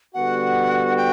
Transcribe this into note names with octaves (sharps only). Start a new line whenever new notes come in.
D3 G3 B3 F#4 F#5
G5